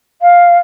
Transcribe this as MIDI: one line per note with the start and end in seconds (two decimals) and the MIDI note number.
0.21 0.57 77